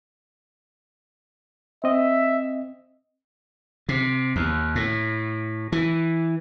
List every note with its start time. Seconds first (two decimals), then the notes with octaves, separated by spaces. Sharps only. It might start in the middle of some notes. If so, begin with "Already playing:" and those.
1.84 C4 D#5 E5
3.89 C3
4.36 D#2
4.75 A2
5.72 E3